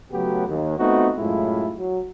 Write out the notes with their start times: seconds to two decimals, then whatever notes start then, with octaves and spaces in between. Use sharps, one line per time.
0.12 C#3 F#3 A3 B3 F#4 G4
0.47 D#2
0.78 A3 B3 C4 D#4 F4 F#4
1.18 F#2 A2 G#3 E4 F4
1.77 F#3